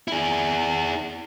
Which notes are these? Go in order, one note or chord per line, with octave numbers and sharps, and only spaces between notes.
E4 G#4